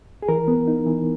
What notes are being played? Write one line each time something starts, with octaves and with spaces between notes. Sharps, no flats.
G#4
E3 A#4
B3
D#4
E3